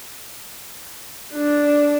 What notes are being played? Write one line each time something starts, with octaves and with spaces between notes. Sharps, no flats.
D4